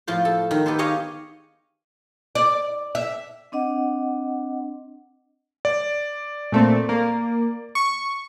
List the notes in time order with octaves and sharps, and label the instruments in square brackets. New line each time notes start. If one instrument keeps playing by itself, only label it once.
[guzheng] A2 F3 F4 C5
A4
D#3
B3 G4 A4 C5
G4 G#4 C#5 D#5 F5
[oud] D5
E5
[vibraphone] C4 D4 D#5 F#5
[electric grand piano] D5
[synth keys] A#2 A3 C4
A#3
C#6